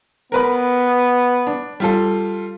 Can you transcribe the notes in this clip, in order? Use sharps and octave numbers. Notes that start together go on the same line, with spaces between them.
B3 A#4 B4 B5
D4
G3 F4 A4